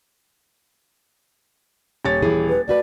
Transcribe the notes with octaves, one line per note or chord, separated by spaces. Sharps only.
D#1 C#5 A6
E3 E4 G#4
B4
A3 F#4 B4 D5